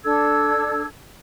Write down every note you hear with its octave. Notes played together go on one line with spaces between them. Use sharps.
D4 A4 E6 G#6